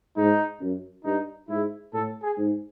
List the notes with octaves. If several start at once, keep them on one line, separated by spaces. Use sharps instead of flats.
G#2 D#4
F#2
G2 D#4
G#2 E4
A2 A4
G#4
G#2